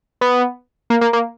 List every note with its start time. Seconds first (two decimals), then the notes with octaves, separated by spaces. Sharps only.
0.21 B3
0.90 A#3
1.01 A#3
1.13 A#3